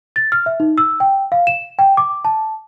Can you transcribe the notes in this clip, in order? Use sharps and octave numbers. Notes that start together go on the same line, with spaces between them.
A6
F6
E5
D#4
E6
G5
F5
E7
G5
D6
A5